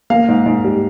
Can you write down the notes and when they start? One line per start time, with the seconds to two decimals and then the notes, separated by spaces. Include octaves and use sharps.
0.10 A#3 F5
0.28 G#2
0.46 G#2
0.65 G3